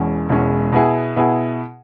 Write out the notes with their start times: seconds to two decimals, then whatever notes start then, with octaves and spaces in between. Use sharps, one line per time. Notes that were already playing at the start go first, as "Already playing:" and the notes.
Already playing: E1 E2 B2 G#3 C#4
0.29 E1 E2 B2 G#3 C#4
0.72 B2 B3 E4 G#4
1.16 B2 B3 E4 G#4